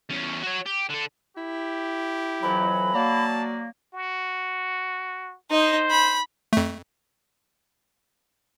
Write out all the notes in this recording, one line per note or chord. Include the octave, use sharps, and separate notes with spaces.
E2 C#4
F#4 C#5
G4
D3 A4
E4 G4
F2 E3 F#3 B5
F#3 A#3 D5 A5
F#4
D#4 C5 D#5
B5
F2 A3